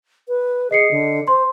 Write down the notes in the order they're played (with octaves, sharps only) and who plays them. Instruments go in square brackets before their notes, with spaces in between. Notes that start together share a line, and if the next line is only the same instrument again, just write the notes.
[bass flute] B4
[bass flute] G#4 [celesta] D#5 C7 C#7
[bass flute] D3
[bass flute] C5 [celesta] C6